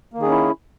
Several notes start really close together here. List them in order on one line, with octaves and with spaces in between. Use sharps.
A#3 D#3 G#4 C#4 E4